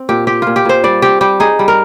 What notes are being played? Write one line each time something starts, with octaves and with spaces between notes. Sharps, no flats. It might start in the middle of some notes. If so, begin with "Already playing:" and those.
Already playing: C4
A#2 G4
C4 G4
A#2 F4
G4
A#2 C5
G3 D5
C4 G4
G3 G4
D#4 G#4
G3
A#4